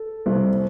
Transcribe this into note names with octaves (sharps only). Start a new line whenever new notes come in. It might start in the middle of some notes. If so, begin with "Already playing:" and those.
Already playing: A4
C2